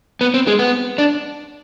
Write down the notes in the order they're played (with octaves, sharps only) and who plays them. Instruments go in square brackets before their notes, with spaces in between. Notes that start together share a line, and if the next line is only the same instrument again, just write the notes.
[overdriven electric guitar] B3
C4
G#3
B3
D4